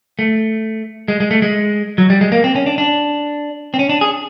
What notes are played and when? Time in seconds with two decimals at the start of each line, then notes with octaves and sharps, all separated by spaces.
0.19 A3
1.08 G#3
1.20 G#3
1.31 A3
1.42 G#3
1.98 F#3
2.10 G3
2.21 G#3
2.32 A#3
2.44 C4
2.56 C#4
2.66 D4
2.78 D4
3.74 C4
3.79 C#4
3.89 D4
4.01 G#4